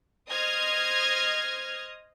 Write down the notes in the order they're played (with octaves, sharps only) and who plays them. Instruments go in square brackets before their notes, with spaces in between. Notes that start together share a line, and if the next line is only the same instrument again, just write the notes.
[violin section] C5 D#5 D#6 F6 G#6